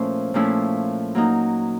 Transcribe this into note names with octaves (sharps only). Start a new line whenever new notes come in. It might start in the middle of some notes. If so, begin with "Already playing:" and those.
Already playing: A#2 F3 A3 C#4 E4 C5
A#2 F3 A3 C#4 E4
F#3 A#3 D#4